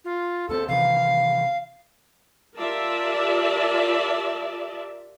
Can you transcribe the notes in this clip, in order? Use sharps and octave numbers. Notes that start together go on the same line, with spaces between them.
F4
D#2 B3 C4 A4
C3 D#3 E3 F5
F4 G4 A#4 D5 E5 A5